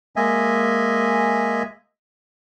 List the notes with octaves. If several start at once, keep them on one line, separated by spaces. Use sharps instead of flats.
G#3 A#3 D#5 E5 G#5